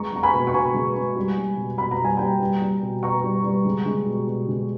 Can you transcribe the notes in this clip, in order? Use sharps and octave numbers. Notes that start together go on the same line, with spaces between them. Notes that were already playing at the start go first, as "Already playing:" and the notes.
Already playing: G#3 A#5 C#6
G#3 A#5
G#5 B5
B2
C#6
B2 G#5 B5
G#3
G#3
G3
G3
B2
B2 B5
A#5
G3
G#5
G3 G5 A#5
G3
G3
B2
B2 A#5 C#6
G3
G3
G#3
G#3
B2
B2
G#3